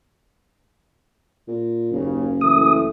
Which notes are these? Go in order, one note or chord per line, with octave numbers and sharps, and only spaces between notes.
A#2
F#1 D#2 C#3
E3 A3 D#6